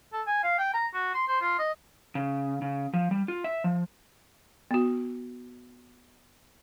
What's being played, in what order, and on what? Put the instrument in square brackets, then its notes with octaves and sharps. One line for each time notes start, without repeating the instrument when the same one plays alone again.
[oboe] A4
G#5
F5
G5
A#5
F#4
C6
C5
F4
D#5
[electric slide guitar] C#3
C#3
F3
G3
F4
E5
F3
[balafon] B3 F#4